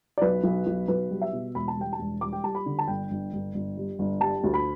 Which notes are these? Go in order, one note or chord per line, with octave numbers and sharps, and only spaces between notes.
D5
B1 B4
B1
B1
B1 B4
G3
E5
B2
E1 B5
A5
G3 G5
A5
E1
G3 D6
G5
G3 A5
B5
D3
A5
G1 G5
G1
G1
G1
G3
G1
G3 A5
D2
B5